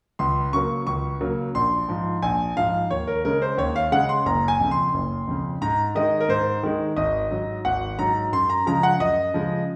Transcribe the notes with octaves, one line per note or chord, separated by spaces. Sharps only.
C#2 C6
C#3 F#3 A#3 C#6
C#2 C#6
C#3 F#3 A#3
A#1 C6
G#2 F3
A#1 G#5
G#2 F3 F5
D#2 C#5
A#4
C#3 G#3 C#4 A#4
C5
D#2 C#5
F5
C#3 G#3 C#4 F#5
C6
F#1 A#5
G#5
F2 C#3
C6
F#1
F2 C#3
G#2 A#5
D#3 G#3 D#4 D#5
A#4
G#2 C5
D#3 G#3 D#4
G#1 D#5
G#2 F#3
G#1 F#5
G#2 F#3 A#5
F#2 C6
A#5
C#3 F3 G#3 A#5
F#5
F#2 D#5
C#3 F3 G#3